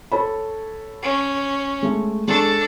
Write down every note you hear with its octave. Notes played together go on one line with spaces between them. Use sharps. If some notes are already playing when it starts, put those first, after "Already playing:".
A4 C#5 B5
C#4
G#3 A3
G#3 D4 A4 C#6